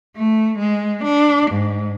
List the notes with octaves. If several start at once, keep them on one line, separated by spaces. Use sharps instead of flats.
A3
G#3
D4
G#2